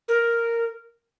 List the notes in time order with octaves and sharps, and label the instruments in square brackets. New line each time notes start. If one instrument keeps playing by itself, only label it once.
[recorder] A#4